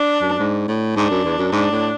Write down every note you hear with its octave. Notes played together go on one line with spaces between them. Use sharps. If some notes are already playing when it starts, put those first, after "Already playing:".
Already playing: D4
F#2
G#2
A2
G#2 D4
F#2
E2
F#2
G#2 D4
A2